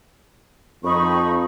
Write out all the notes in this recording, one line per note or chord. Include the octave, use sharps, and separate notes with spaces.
F2 D#4 B5 C#6